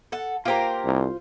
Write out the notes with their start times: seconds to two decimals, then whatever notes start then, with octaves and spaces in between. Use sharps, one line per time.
0.12 A4 F#5
0.45 A#3 F4 G4 A#4 C5
0.85 C2